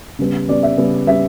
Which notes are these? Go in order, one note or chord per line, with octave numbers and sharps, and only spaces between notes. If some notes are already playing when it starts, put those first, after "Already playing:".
C#3 G3 B3
C#3 G3 B3 D5
E5
C#3 G3 B3
C#3 G3 B3 E5